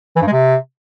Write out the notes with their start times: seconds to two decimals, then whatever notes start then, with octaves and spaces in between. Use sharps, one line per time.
0.16 E3
0.22 G2
0.27 G#3
0.32 C3